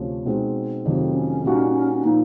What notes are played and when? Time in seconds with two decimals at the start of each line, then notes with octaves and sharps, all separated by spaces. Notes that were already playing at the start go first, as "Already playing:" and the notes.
Already playing: D2 C3 F3 C#4
0.25 B2 G#3 C4 D#4
0.85 F2 C3 D#3 F#3 A3 C4
1.14 C#4
1.44 A#2 G3 A#3 D#4 F#4
2.03 A#2 F3 A#3 D#4